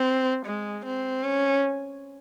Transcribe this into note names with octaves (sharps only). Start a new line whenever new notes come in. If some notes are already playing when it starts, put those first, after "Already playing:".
Already playing: C4
G#3
C4
C#4